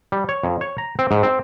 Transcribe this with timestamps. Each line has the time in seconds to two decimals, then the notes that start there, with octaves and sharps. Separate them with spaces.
0.12 G3
0.29 C#5
0.43 F2
0.61 C#5
0.78 A#5
0.99 C4
1.11 G#2
1.23 C4